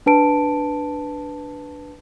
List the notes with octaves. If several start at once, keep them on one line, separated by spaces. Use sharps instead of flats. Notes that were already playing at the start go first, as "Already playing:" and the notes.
D4 B4 A5 D7